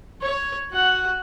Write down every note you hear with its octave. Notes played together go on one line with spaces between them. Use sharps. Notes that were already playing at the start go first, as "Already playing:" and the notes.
C#5
F#4 F#5